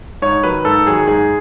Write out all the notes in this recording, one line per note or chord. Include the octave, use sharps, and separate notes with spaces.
G#2 C#5
D#3 F#3 B4
G#2 A4
D#3 F#3 G#4
G#2 G#4